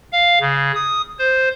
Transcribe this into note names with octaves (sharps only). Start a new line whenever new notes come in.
F5
C#3
D#6
C5